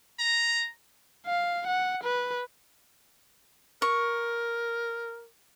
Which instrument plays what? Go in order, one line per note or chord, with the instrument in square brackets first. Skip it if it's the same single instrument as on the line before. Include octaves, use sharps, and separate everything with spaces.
[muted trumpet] A#5
[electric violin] F5
F#5
B4
[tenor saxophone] A#4 [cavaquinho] C#6